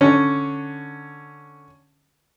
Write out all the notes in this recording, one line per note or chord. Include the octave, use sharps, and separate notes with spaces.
D3 C#4